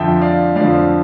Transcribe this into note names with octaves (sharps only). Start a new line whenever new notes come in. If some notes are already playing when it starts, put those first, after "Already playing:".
Already playing: F2 D3 F3 E5 G5
D5 F5
F2 D3 F3 D5 F5